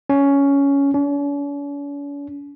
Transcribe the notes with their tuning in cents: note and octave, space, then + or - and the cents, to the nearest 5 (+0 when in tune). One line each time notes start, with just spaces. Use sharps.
C#4 +10
C#4 +45